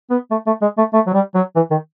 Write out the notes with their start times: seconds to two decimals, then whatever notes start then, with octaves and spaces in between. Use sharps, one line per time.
0.10 B3
0.31 A3
0.46 A3
0.61 G#3
0.78 A3
0.93 A3
1.07 F#3
1.14 G3
1.35 F#3
1.56 E3
1.71 D#3